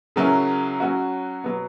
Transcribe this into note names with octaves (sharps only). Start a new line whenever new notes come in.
C#3 F#3 C#4 E4 A#4
F#3 C#4 F#4
B2 F#3 B3